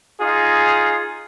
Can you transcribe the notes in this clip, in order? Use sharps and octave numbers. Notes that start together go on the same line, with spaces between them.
D#4 F4 G#4